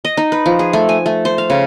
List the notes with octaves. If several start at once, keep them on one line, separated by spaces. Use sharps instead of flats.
D#5
D#4
B4
F3
G#4
A3
G#5
A3
C5
F5
C#3